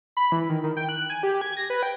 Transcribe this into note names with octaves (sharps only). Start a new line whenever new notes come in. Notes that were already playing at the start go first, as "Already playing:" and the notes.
B5
E3
D#3
D#3
G5
F#6
G#5
G4
G#6
A#6
B4
G5